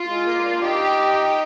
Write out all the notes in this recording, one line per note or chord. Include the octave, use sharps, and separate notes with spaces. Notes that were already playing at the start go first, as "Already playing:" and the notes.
Already playing: F4
G#3
A#3
D4
D#4 G4